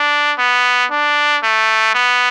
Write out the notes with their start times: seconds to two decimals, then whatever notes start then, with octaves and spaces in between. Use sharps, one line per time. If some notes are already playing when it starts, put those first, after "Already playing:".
Already playing: D4
0.39 B3
0.91 D4
1.43 A3
1.95 B3